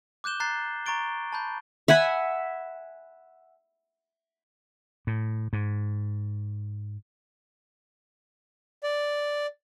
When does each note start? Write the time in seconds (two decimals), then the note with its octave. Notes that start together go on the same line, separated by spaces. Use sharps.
0.24 D6 F#6 G6 E7 G7
0.40 A#5 F#6 A6 C7
0.86 A#5 C#6 A6 D7 G7
1.32 A5 B5 G6
1.88 E5 F#5 G#5 B5
5.07 A2
5.53 G#2
8.83 D5